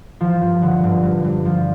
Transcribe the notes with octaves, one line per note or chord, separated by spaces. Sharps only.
F3
G2
D3
G2
G2
G2
F3